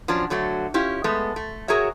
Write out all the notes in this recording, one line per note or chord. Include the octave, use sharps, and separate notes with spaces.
F3 F#3 C#4 D4
D3 F#3 A3 F#4
C#4 E4 F4 G4
G#3 A3 B3
A3
F#4 G#4 A#4 C#5 E5